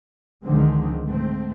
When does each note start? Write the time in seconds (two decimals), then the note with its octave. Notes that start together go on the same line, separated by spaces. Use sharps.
0.45 C#2 D3 D#3 F3 G#3 C4
1.05 G#2 A3 C4